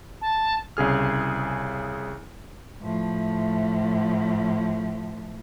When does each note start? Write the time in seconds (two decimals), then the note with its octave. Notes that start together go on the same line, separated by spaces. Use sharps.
0.21 A5
0.77 C2 C#3 G#4 F6
2.81 A2 F3